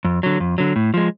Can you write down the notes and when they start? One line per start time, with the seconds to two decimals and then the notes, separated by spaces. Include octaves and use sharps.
0.05 F2
0.23 D3 F#3
0.40 F2
0.58 D3 F#3
0.76 A2
0.94 F3 G#3